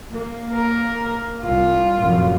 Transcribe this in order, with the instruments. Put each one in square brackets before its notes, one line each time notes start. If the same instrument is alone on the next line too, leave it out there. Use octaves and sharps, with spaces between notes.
[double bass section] A#3
[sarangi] A#4
[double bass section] C2 [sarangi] F4
[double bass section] F1 A#1 F#2